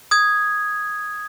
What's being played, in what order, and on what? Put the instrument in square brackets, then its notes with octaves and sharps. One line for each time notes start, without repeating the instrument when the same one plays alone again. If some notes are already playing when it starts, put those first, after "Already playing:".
[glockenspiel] D#6 G#6